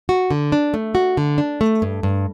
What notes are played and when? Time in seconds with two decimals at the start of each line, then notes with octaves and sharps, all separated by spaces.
0.09 F#4
0.31 D3
0.52 D4
0.74 A3
0.95 F#4
1.17 D3
1.38 D4
1.61 A3
1.82 G2
2.03 G2